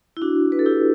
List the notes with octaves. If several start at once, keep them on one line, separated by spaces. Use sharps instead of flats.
E4
D4 F#4
B4
A4
E4 G4